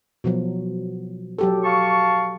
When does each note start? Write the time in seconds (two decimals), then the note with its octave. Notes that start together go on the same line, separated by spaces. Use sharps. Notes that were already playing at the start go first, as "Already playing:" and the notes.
0.24 B2 F3 F#3
1.39 F#3 G4 A4
1.64 F5 A5 C#6